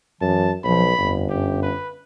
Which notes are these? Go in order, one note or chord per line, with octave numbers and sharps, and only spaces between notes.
F#2 E3 A5
B1 F3 B5
G1 F2
F#2 G4
B4